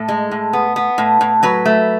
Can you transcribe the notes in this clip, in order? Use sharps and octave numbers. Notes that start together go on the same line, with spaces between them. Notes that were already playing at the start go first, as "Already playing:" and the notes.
Already playing: A2 A4
G#3
A2
B3
B3
A2
A2
F#3 B4
A3